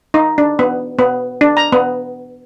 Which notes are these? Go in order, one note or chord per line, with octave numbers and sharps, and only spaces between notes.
D#4
D4
B3
B3
D4
A#5
B3